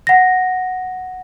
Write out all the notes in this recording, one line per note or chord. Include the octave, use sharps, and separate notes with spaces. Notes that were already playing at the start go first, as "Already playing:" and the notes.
F#5 A#6